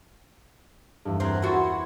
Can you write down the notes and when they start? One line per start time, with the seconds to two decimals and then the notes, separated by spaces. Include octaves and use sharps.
1.05 E2 G2
1.20 B3 C4 A#4 F#6 G#6
1.42 E4 F#4 B5 C6 A6